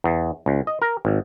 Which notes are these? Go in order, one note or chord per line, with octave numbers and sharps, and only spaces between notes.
E2
C#2
D#5
A#4
G#1